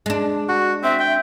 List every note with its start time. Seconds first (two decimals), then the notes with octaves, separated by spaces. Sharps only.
0.06 G#3 D4
0.49 F#4
0.83 C4 E5
1.00 G5